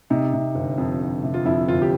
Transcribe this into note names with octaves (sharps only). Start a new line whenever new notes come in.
C3 D#4
C3
G1
F2
G1
C3
F4
F2 E4
G1 F4
G4